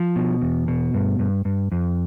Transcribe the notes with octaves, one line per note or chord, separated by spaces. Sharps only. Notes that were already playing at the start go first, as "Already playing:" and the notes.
Already playing: F3
B2
E2
B2
G2
G2
G2
F2